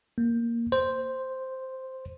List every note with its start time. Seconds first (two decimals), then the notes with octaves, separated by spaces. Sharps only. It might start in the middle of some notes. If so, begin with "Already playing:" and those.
0.18 A#3
0.72 C5